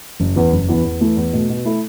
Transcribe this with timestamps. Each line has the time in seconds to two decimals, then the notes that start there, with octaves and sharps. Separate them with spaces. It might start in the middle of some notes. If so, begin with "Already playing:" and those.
0.20 F#1
0.36 E2 E3
0.52 F#1
0.68 E2 E3 B3
0.84 E2
1.01 E3 A3
1.17 E2
1.33 B2 A3
1.49 B2
1.65 A3 E4 A4